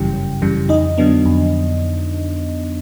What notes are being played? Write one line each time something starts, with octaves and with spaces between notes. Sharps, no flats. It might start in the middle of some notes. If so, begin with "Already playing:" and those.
Already playing: G1 F#2 C#3 E3 G3 G4 G5
G1
F#2 C#3 E3 G3
F2 D#4 D#5
D3 F#3 B3 D4
F2